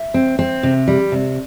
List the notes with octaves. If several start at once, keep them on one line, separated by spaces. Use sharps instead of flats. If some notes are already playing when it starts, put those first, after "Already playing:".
Already playing: E5
C4
C4
C3
G3
C3